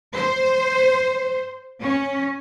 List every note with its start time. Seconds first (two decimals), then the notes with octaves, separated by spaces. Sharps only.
0.14 C5
1.81 C#4